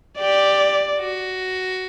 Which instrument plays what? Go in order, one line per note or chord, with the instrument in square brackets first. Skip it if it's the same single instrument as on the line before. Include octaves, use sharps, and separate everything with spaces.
[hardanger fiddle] G4 [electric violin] D5
[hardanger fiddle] F#4